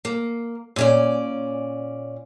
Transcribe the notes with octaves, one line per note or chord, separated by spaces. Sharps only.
A#3
A#2 C#4 D5